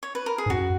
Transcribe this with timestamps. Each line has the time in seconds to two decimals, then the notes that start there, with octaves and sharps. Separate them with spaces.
0.03 C#5
0.15 B4
0.26 A#4
0.38 G#4
0.46 G#2
0.50 F#2 F#4